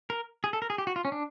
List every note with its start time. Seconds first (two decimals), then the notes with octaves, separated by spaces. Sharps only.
0.10 A#4
0.44 G#4
0.53 A4
0.62 A#4
0.70 G#4
0.78 G4
0.87 F#4
0.96 F4
1.05 C#4
1.12 D4